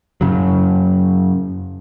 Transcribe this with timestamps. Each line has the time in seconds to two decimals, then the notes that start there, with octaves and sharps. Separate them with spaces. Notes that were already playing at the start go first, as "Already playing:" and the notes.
0.21 F#2 C#3 F#3